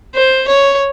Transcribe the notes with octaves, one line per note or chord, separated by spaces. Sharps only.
C5
C#5